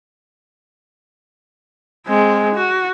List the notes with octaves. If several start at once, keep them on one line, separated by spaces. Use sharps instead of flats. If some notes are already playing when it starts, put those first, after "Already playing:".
G#3 C4
F#4